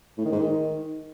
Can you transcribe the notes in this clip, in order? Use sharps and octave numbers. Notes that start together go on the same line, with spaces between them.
A2
D#3
G#2
D#3